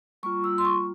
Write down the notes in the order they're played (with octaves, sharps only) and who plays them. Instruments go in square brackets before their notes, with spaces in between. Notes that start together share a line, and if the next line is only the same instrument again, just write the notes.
[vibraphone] G3 A#3 F4 C#6
E6
C6
C#6